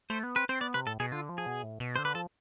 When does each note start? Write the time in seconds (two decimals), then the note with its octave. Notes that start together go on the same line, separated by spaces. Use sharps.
0.10 A3 C5
0.23 B3
0.35 C4 B4
0.49 C4 C5
0.61 B3 D5
0.74 C3 B4
0.86 A2 A4
1.00 B2 G#4
1.12 D3 F4
1.29 F3
1.38 G#4
1.46 B2
1.63 A2
1.80 B2
1.96 D3 C5
2.05 B4
2.15 F3 A4